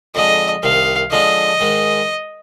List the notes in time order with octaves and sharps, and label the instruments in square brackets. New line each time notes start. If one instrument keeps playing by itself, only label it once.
[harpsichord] F2 D3 G#3 [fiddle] D#5
[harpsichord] C2 C3 D#3 [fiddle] F5
[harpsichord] D3 F3 G#3 D4 [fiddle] D#5
[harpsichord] G#2 D#3 G#3